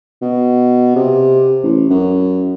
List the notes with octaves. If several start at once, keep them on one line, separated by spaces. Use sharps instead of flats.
B2
C3
A1
F#2